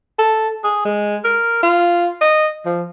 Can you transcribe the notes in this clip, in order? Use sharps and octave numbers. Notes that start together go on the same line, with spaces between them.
A4
G#4
G#3
A#4
F4
D#5
F3